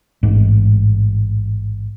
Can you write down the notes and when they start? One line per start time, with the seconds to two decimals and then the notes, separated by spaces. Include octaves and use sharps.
0.23 A1 G#2